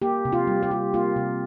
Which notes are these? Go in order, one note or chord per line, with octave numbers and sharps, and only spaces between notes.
A#3 G4
C3
F4
G3
G4
F4
A#3 F4
C3